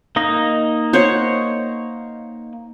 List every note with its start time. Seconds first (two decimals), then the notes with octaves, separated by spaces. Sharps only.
0.16 A#3 D#4 D#5
0.93 C5 C#5 F#5